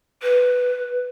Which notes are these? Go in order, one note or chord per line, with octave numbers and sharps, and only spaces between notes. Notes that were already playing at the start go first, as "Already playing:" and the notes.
B4